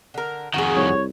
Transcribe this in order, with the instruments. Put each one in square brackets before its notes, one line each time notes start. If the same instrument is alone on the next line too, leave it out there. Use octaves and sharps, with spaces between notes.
[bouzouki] D3 A#4
[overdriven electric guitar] F2 D#3 [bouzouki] F#4 G#4
[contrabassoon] C2 [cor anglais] C#5